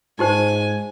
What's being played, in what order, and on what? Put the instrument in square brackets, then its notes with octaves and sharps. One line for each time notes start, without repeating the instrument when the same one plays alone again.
[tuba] G#2 [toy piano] D#4 G4 C5 [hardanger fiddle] G#5